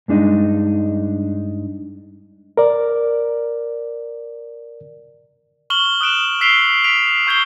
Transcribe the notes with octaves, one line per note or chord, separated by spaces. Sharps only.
G2 G#3 D4 D#4
A#4 D5
C#6 F6 E7 F#7 G7
D#6 F#6 D7 E7
E6 B6 C7 D7 F7 G7
B6 D7 F7
C#6 G6 G#6 C7 G7